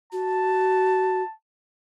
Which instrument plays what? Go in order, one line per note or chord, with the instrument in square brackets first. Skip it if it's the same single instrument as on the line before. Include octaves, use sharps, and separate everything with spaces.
[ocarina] F#4 [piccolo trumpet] A5